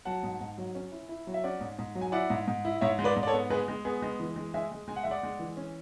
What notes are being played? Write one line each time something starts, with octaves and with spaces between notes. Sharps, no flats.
F#3 F#5 A5
G#2
G#2
F#3
C#4
E4
E4
F#3
E5
C#4 D5 F#5
G#2
G#2
F#3
G#5
E4 D5 F#5
G#2
G#2
E4
G#2 C#5 E5
G#3
B4 D5
G#2
D5
A4 C#5
B3
G#3 G#4 B4
G#3
B3 G#4
G#3
E3
G#3
G#3 E5 G#5
G#3
G#3 G#5
F#5
G#3 E5
D5 F#5
G#3
E3
C#4